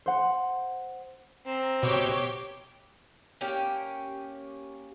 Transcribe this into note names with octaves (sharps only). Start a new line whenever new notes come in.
C5 F#5
C4 A#5
B2 G4 C#5 D6
A#3 C#4 G4